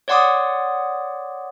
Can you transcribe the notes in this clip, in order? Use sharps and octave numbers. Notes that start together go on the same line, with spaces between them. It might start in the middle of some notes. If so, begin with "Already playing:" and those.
C#5 D5 F#5 C6 D6 D#6